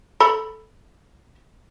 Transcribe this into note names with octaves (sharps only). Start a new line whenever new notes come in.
A4 B5